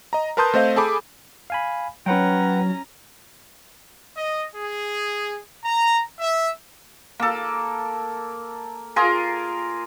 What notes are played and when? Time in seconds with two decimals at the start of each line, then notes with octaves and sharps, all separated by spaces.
0.13 D#5 A#5
0.37 A#4 B4 A5 C6 D#6 G6
0.54 A3 C4 C5 D#5 F5
0.76 G#4 A4 G#5 A5 B5 D6
1.50 F5 G#5 B5
2.06 F#3 C#4 B4 F#5 G5 A#5
4.17 D#5
4.56 G#4
5.65 A#5
6.20 E5
7.20 A#3 A4
8.96 F4 G#4 A#4